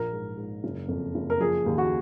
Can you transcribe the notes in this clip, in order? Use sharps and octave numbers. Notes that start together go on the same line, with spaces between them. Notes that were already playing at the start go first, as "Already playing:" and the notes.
Already playing: A#1 A#4
G#2
G#2
F#1
F2
F#1
A#4
F3 G#4
D#2
F#4